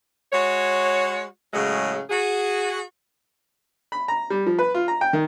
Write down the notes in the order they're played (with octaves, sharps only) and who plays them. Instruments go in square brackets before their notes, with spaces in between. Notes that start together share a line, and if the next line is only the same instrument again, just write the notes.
[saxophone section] G#3 F#4 C#5
A2 C#3 F#3 G#3
F#4 G#4
[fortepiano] B5
A#5
G3
F3
B4
F4
A#5
G5
D#3